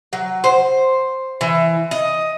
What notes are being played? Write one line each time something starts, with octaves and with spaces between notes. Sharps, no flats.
F#3
C5
E3
D#5